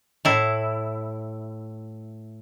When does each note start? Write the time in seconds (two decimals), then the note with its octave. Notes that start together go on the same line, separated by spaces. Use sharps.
0.25 A2 E4